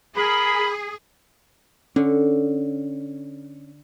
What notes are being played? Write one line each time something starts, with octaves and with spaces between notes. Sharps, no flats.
G#4 A#4 B5
D3 C#4